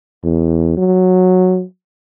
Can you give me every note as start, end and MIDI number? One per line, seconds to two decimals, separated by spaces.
0.24 0.74 40
0.77 1.63 54